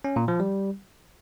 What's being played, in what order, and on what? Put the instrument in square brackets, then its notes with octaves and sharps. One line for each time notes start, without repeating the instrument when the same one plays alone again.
[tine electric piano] C#4
A#2
F3
G3